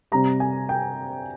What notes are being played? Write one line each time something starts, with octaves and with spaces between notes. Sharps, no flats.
C3 G3 A#5
G#5
G5